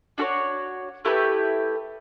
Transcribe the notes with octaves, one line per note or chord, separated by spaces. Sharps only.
D4 F#4 A4 C#5
A3 E4 G4 B4